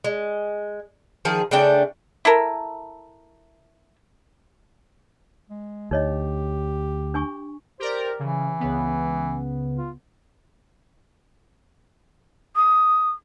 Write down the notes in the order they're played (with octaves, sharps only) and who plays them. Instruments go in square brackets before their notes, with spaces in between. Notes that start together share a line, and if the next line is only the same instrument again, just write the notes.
[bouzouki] G#3
D#3 F3 G#4
C#3 A3 D4 G5
[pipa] E4 A4 A#4
[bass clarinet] G#3
[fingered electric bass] D2 [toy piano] D#4 C#5 D#5 [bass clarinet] G4
[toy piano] D4 G#5 C#6
[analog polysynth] G4 A#4 D5 [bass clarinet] C5
[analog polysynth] C#3 [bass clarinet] E3
[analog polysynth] C#2 C#3 B3
[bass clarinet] F4
[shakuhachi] D#6